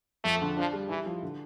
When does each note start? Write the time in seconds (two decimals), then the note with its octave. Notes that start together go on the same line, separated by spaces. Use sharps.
0.24 F2 A3
0.41 D3
0.57 F3 D4
0.73 G3
0.89 E3 E4
1.06 F3
1.23 D3